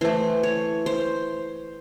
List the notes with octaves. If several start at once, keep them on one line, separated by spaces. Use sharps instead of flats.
E3 A3 C5
C#5
C5